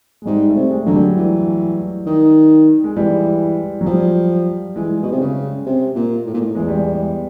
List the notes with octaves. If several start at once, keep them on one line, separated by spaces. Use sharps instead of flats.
G#3
G#2 G3
A3
C3
G#3
D3 F#3
G3
E3
D#3
G#3
E3 G3
F#3
F3 G3
E3 G#3
B2
C3
C#3
C3
A#2
A2
A#2
A2
E2 G#3
G3
G#3